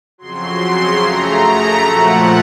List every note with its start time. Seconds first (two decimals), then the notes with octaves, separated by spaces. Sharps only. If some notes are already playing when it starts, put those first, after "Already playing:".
0.18 F2 C#3 F#3 C6
1.02 F#2 C#3 A3 A#5
1.84 A#2 F3 A3 F#5